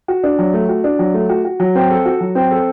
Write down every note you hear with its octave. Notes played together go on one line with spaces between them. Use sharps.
F#4
D4
F#3
A3
F#4
D4
F#3
A3
F#4
F#4
F#3
C4
A4
F#4
F#3
C4
A4